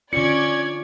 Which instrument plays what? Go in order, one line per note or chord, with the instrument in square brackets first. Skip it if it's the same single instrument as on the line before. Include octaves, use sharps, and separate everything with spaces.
[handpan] D3 F4 [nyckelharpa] C#4 [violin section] D5 G#6 [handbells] C#7